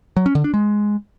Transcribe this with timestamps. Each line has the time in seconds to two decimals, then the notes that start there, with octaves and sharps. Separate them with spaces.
0.17 F#3
0.26 C#4
0.35 D3
0.44 D4
0.54 G#3